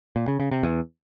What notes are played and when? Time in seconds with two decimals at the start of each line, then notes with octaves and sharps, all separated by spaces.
0.16 A#2
0.28 C#3
0.40 C#3
0.51 C3
0.63 E2